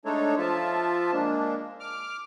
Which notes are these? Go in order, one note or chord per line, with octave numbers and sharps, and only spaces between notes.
G#3 A3 D4 D#4 A4 C#5
F3 F4 E5 A5
G#3 A#3 D4
D6 F6